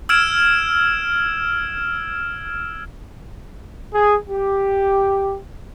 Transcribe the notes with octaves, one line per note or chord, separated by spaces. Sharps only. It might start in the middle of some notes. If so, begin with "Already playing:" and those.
E6 F6 G#6 D7 E7
G#4
G4